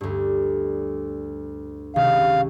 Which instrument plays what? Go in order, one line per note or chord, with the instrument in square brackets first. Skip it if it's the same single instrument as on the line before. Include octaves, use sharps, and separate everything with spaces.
[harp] D2 G2
[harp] C#2 C3 D#3 [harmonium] F5